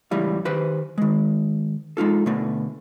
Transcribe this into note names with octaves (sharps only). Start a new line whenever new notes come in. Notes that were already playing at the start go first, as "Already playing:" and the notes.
C#2 A2 E3 G3 F5
D#3 G4 B4 C5
D#3 G#3
G#3 D#4 F4 A4
B2 D3 A3